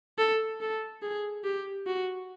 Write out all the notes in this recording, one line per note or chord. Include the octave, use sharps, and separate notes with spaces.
A4
A4
G#4
G4
F#4